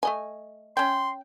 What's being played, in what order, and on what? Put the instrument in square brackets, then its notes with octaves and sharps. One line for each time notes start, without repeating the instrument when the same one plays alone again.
[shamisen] A3 D#5 G#5
[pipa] C#4 G5 [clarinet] C6